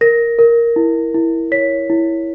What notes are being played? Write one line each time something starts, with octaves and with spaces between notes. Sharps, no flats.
A#4 A#6
A#4
E4
E4
C#5 B6
E4